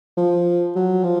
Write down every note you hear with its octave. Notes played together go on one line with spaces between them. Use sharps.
F3
F#3
F3